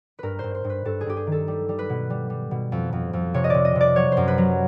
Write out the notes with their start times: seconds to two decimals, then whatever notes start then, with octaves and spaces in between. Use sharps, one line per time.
0.19 G2 A#4 B4
0.39 G2 C5
0.55 C5
0.64 G2
0.70 B4
0.85 G2 A4
1.01 G#4
1.06 G2 G4
1.17 G#4
1.27 D#3
1.32 A4
1.48 G3
1.69 G3
1.79 B4
1.90 B2
2.10 G3
2.30 G3
2.51 B2
2.72 F2
2.93 F2
3.13 F2
3.34 C3 C#5
3.44 D#5
3.50 C3 D5
3.65 D#5
3.75 C3
3.81 D5
3.96 F#3 C#5
4.12 C5
4.17 F#2
4.28 B4
4.38 F#3